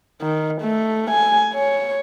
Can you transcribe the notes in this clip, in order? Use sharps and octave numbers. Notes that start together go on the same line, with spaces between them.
D#3
A3
G#5
C#5